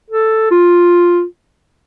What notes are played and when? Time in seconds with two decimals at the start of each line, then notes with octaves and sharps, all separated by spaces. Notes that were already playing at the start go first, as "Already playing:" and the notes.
0.10 A4
0.51 F4